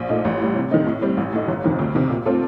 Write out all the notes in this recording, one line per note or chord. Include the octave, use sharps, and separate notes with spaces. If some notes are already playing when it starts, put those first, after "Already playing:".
Already playing: A#1
A#2 A3 D#4
A1
A2 G3
C3
D#3 A3 C4 D#4
A2
G3 C4
A1
A2 A3 D#4
G1
F2 C3 D#3
D2
C3 D#3
A#2
A3 C4 F4 A4